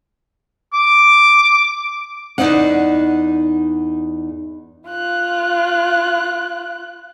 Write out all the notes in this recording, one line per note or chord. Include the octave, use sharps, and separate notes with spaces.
D6
E2 G2 D#4 D5 D#5 F#5
F4 F#6